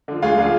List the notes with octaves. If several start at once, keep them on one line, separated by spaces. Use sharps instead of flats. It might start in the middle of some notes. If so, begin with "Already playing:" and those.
D3 F3
D2 F4 G#4
D3 F3